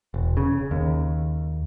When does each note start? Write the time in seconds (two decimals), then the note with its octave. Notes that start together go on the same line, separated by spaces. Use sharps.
0.14 E1
0.37 C#3
0.71 D#2